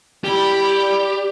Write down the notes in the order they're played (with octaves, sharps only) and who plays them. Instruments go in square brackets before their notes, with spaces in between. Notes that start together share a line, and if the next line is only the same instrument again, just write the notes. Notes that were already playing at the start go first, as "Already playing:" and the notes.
[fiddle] E4 B5 [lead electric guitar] G4 [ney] D5